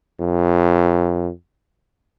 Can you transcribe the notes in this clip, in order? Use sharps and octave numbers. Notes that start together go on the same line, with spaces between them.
F2